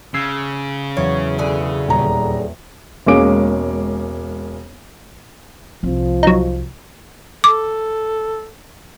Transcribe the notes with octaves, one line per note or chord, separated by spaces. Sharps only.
C#3 E6 G#6 C7
E2 F#3 C#4
B2 D3 G#4
D#1 A#5
E1 G#3 A#3 C#4 D6 D7
C2 F3 C4
F#3 D#4
A4 D6